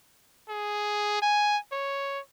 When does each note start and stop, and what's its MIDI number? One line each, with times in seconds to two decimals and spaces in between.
0.49 1.19 68
1.22 1.57 80
1.72 2.20 73